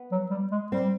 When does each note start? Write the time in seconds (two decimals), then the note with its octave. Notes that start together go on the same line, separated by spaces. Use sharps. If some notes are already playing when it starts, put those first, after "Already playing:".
Already playing: B3
0.11 F#3
0.31 G3
0.51 G#3
0.72 G3 C4